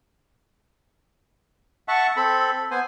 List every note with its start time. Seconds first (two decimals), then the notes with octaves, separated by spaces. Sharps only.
1.88 E5 F#5 A5 C#6
2.17 C4 A4 B5
2.71 B3 C5 G#5